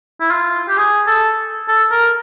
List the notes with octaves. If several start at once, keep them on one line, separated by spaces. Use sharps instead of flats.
E4
F4
G4
G#4
A4
A4
A#4